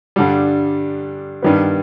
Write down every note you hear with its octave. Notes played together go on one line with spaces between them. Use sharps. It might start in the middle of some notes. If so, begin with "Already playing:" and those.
G2 D3 G3
G2 D#3 G3 B3